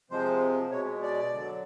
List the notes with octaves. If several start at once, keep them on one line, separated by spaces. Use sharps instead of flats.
C3 F3 G#3 C5
B2 G#3 C#5
D5
D3 F#3